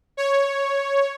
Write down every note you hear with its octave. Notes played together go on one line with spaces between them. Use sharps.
C#5